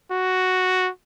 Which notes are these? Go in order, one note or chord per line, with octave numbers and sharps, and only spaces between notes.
F#4